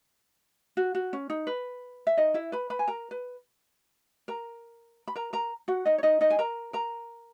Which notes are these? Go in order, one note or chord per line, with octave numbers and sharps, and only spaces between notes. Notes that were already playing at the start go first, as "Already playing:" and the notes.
F#4
F#4
C#4
D#4
B4
E5
D#4 D#5
E4 E5
B4 B5
B4 B5
G#5
A#4 A#5
B4
A#4 A#5
B5
A#4 A#5
A#4 A#5
F#4 F#5
D#4 D#5
C#5
D#4 D#5
D#4 D#5
G#5
A#4 A#5
A#4 A#5